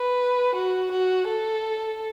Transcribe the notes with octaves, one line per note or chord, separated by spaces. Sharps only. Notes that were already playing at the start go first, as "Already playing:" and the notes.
Already playing: B4
F#4
F#4
A4